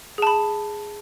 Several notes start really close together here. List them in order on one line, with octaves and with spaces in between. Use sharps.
G#4 A5 B5